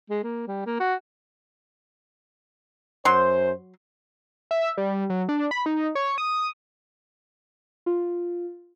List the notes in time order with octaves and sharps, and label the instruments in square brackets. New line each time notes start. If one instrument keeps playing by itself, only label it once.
[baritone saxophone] G#3
A#3
G3
A#3
F#4
[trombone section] F#2 C5 [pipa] F#3 C6
[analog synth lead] E5
G3
F#3
D4
B5
D#4
C#5
D#6
[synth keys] F4